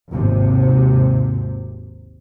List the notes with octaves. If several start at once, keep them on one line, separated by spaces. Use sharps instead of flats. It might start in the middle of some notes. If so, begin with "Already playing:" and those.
G#1 D#2 C3